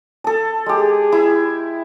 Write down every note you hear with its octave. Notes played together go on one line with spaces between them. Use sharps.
A4 A5
G#3 G4 G#4
E4